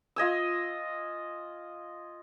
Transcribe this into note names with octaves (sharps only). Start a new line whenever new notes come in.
F4 D#5 G#5 E6